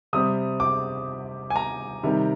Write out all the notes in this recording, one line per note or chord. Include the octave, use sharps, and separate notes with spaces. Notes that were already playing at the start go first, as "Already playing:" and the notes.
C3 G3 C4 D#6
D6
G#5
A#5
C3 D#3 G3 C4